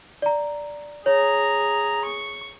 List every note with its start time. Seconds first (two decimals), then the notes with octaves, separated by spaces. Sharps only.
0.22 D5 A#5
1.06 G#4 C#5 A#5
2.05 C#6